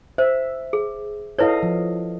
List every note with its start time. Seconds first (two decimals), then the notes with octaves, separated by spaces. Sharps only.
0.18 C5 E5
0.73 G#4
1.39 E4 A4 B4 C#5 D#5 F5
1.63 F3